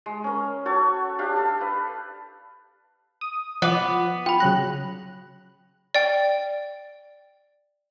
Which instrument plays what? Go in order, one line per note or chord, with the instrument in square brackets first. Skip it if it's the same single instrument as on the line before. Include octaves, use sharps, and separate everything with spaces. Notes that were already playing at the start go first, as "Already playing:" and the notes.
[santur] G#3
C#4 A#4
F#4 A4 C#5
D4 G4 F5
A4
B4 F5
[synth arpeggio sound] D#6
[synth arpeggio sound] F3 [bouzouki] B3 [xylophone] D6 F#6
[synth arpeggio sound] F4 [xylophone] G5 B5
[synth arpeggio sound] C#3 F#3 F#6 [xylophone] A#6
[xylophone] D5 G5